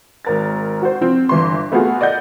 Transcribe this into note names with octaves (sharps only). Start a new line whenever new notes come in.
G#1 A#4 A6
F#4 C5
F3 C4 F4
G1 E3 C6
A3 B3 F4 F#4 G#4
D5 D#5 F#5 G6